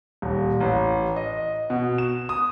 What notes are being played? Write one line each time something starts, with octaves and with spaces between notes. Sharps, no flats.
D#1
A1
D#5
B2
E7
D#6